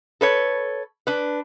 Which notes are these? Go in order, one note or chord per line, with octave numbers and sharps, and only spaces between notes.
A4 B4 C#5
D4 B4